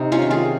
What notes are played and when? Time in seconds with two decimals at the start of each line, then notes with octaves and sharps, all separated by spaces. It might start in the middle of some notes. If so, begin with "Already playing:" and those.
Already playing: C3 D#4
0.12 C#4 F4
0.22 D#3
0.31 F4 G#4